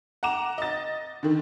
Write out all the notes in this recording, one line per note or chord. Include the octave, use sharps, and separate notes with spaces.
F#5 A#5 D6 E7
D#5 A6
D3 D#3